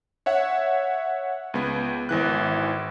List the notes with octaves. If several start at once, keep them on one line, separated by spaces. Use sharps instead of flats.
C#5 E5 F#5
C#2 B3
G#1 E3 F#6